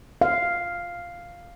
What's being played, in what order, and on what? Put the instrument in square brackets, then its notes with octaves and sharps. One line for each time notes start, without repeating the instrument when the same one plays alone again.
[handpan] F5